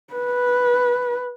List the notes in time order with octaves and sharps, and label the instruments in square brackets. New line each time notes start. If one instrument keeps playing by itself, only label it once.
[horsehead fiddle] B4